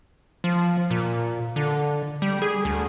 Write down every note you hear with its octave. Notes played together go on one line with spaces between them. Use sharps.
F3
A#2
D3
G3
G#4
D2